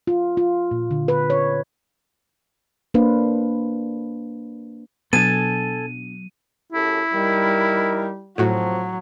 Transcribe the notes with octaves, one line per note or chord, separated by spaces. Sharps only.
F4
F4
A#2
D3
B4
C#5
A#3 D4 B4 C5 F5
B2 F#3 B3 D4 A4 G#5 A5 D#7
F#2 E4 G4 A4
G3 D#4 A#4
A2 C3 F3 F#3 F#4